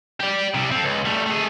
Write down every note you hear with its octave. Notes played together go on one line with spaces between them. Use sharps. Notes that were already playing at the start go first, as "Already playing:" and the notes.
G4 D5
C3 G3
C4 A4
C#2
G3 A3
A3 G#4